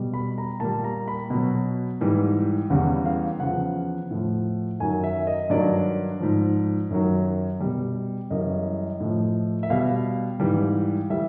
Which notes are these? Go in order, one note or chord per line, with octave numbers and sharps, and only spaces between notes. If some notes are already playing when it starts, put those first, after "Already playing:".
Already playing: B2 G3
B5
A#5
A#2 G3 A5
A#5
B5
B2 F#3
G#2 E3 G3
E2 C#3 E3 G3 F#5
F5
E2 C#3 F3 F#5
A2 F3
F#2 D#3 F#3 G#5
E5
D#5
G2 D#3 F#3 D5
G#2 F3
F#2 D#3 F#3
B2 G3
F#2 C#3 E3 G3 D#5
A2 F3
E5
B2 G3 F5
G#2 E3 G3
E3 G3 E5